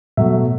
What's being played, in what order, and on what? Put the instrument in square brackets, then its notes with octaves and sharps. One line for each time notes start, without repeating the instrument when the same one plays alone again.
[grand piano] B2 F#3 A3 E5